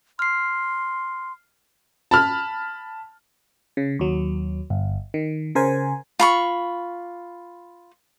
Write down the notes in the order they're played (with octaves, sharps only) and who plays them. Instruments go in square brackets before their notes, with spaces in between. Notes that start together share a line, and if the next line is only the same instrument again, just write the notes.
[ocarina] C6 [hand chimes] F6 C7
[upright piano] A5 B5 F6
[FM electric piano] C#3
D#2 F#3
G1
D#3
C#3 A#4 C5 G#5
[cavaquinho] F4 B5 C#6